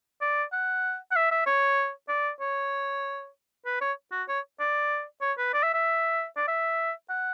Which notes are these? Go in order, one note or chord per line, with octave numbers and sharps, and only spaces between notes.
D5
F#5
F#5
E5
E5
C#5
D5
C#5
B4
C#5
F#4
C#5
D5
C#5
B4
D5
E5
E5
D5
E5
F#5